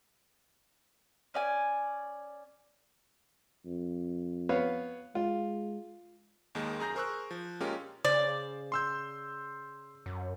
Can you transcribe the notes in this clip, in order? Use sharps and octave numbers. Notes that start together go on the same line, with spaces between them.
C#4 D5 G#5
F2
B3 C#5 F5
G#3 F4
D#2 D#3 G#3 A#3
F#2 G#4 A#5 G6 A#6
G#4 A#4 C5 C#6 E6 F#6
F3
A#2 G#3 C#4 F4 G4 A#4
C#3 C5 D5
C6 E6 G6
F#2